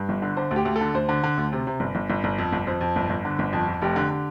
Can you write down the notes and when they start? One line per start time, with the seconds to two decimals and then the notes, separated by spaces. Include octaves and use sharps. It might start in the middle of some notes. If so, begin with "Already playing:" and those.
Already playing: G2
0.09 G1
0.22 D3
0.37 D3 C5
0.51 D2
0.56 G4
0.65 D2
0.76 A4
0.81 D3
0.94 D2 C5
1.09 D3
1.23 D3
1.37 D2
1.53 C3
1.67 C3
1.80 G1
1.95 G1
2.10 G1
2.24 G1
2.38 F2
2.53 G1
2.67 F2 C5
2.81 F2
2.96 G1
3.09 G1
3.25 D3
3.39 G1
3.53 F2
3.68 F2
3.82 F1 G4
3.96 D3
4.10 D3